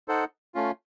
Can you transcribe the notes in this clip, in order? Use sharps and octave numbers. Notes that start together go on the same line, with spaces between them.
D#4 A4 C5 F#5
A3 C#4 F4